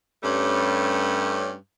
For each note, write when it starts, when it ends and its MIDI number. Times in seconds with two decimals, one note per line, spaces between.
0.23 1.53 43
0.23 1.53 55
0.23 1.53 57
0.23 1.53 61